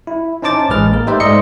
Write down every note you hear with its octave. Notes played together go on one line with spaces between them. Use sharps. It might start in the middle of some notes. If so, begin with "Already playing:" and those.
E4
C#4 D#4 C5 A5 D6 A6
A1 G#3 G#4 B4 F6 A6
A#3 A#4
A3 D#4 G4 B4 C5 E5
G#2 A3 D5 D#5 C6 C#7